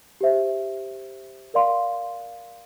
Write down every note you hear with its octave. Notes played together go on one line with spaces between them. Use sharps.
G4 C5 E5
A#4 D5 F5 C6